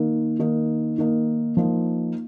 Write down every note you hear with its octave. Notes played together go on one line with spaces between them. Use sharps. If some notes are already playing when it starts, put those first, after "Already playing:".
Already playing: D#3 A#3 D#4
D#3 A#3 D#4
D#3 A#3 D#4
F3 A#3 D#4